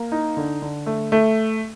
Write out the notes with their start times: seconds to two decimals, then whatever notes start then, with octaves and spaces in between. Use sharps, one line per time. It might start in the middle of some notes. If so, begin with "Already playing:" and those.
Already playing: A#3
0.12 D#4
0.37 D3
0.62 D3
0.86 A3
1.12 A3